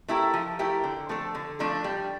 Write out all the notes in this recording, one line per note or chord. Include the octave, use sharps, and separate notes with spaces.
A3 E4 G4 A#4
F3
A3 E4 G4 A#4
D3
F3 A3 D4 A4
D3
F3 A3 D4 A4
G3